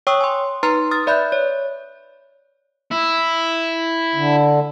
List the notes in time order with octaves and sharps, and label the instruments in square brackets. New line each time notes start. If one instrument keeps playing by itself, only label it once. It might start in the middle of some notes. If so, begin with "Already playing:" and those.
[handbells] C#5 G5 C#6 D#6 E6
G#5 C6
D#4 B4 A#5 C6 F6 C7
D#6 F6 A6
B4 D5 E5 B5 F#6 G6
C#5
[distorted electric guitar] E4
[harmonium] D3